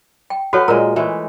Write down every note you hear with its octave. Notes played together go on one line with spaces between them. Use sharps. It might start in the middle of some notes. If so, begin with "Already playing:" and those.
G5
F#3 F#4 A4 B4 C#5 F5
A#2 G#3 A#4 A#5
E3 G#3 A3